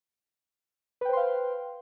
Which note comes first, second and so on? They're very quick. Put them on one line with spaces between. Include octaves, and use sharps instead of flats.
B4 G5 C5 C6 F5